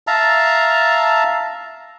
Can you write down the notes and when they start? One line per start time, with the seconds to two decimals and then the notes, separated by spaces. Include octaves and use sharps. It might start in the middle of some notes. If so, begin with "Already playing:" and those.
0.07 E5 F5 A5 A#5